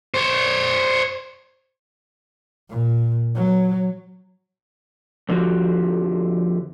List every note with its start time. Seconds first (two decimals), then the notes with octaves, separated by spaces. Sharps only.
0.14 C5 C#5
2.69 A#2
3.36 F#3
5.29 F2 D3 F3 C#4 F#4 G4